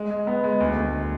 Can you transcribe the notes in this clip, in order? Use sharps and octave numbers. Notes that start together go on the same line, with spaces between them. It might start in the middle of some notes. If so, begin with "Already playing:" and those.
Already playing: G#3
G#3
B3
G#3
D2
D2